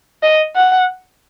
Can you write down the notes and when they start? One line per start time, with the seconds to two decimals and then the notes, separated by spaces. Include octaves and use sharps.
0.23 D#5
0.56 F#5